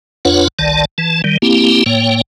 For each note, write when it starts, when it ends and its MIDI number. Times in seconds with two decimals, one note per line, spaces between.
0.25 0.48 41
0.25 0.48 62
0.25 0.48 65
0.25 0.48 71
0.25 0.48 73
0.25 0.48 78
0.59 0.85 31
0.59 0.85 36
0.59 0.85 51
0.59 0.85 74
0.59 0.85 81
0.98 1.22 52
0.98 1.22 81
1.24 1.38 51
1.24 1.38 55
1.42 1.84 58
1.42 1.84 60
1.42 1.84 64
1.42 1.84 67
1.86 2.21 45
1.86 2.21 58
1.86 2.21 73
1.86 2.21 79